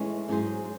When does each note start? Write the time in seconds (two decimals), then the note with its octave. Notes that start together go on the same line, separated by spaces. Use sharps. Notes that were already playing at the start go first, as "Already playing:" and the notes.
Already playing: A2 E3 G#3 C#4
0.28 G#2 F#3 C#4 G#4 C5